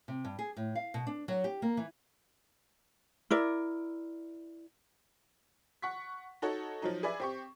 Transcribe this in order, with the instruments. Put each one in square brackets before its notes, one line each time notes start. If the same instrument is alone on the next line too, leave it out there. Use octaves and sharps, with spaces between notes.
[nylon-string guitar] C3
G2
G#4
A2
F5
B2
D4
F#3
G4
A#3
E3
[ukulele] E4 A#4 D5
[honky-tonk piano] F#5 C#6 B6
D#4 F#4 A4 C#5
F3 F#3 D#4
G#4 B4 D5 E5
C4 G4 C#6